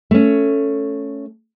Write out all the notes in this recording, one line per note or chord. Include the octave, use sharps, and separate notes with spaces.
A3 C#4